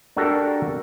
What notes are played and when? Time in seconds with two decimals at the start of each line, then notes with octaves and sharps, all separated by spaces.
0.17 D4 F#4 G4 A4 A#4